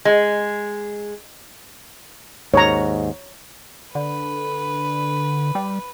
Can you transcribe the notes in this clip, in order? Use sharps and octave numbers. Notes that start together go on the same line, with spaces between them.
G#3
D#2 G#2 C#5 A#5
D3 B4
G3